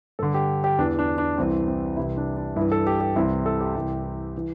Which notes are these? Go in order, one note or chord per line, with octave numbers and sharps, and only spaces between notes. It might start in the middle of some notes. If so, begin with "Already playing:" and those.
G2 D3 A4
G4
G4
E2 E3 D4
D4
D4
C2 C3 E3 C4
C4
C2 C3 E3 E4
D4
D4
G2 E3 E4
A4
G4
G4
C2 C3 E3 E4
A4
G4
C2 C3 E3
E3